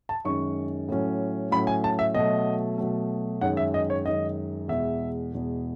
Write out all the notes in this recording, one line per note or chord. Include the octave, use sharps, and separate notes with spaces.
A5
F#2 D#3 G#3 C#4 C#6
A2 F#3 C#4
A2 F#3 C#4 B5
G#5
A5
E5
B2 F#3 A3 D#5
B2 F#3 A3
F#2 D#3 G#3 F#5
E5
D#5
C#5
F#2 D#3 G#3 D#5
E2 B2 G#3 E5
E2 B2 G#3